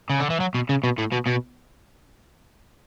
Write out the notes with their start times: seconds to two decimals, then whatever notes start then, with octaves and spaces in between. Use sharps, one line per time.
0.10 C#3
0.20 D3
0.30 E3
0.40 F#3
0.55 B2
0.69 C#3
0.84 B2
0.98 A2
1.12 B2
1.27 B2